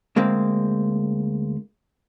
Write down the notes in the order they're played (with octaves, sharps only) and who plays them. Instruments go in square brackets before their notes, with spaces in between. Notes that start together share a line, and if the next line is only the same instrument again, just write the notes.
[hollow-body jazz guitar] D2 G#3 A#3 C4